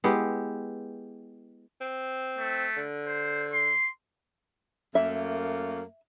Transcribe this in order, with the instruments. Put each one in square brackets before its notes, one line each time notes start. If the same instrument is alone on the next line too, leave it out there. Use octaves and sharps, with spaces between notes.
[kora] G#3 B3 E4 G4
[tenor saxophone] C4
[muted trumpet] A3
[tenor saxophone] D3
[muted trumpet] C5
C6
[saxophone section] F#2 A3 A#3 [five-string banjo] E5